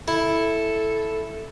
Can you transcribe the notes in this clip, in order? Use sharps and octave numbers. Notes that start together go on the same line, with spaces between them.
E4 A4